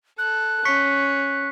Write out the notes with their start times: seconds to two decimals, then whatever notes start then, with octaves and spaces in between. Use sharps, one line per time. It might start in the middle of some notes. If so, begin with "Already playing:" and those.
0.18 A4 F#6
0.65 C#4 C#6 B6 C#7